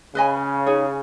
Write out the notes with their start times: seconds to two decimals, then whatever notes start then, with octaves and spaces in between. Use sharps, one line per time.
0.15 C#3 B4 D#5 G#5 B5
0.66 D#4 G#4 C#5